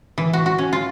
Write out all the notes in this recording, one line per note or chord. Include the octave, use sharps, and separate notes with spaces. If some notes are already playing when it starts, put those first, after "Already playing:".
E3
F#4
F#4
C#4
F4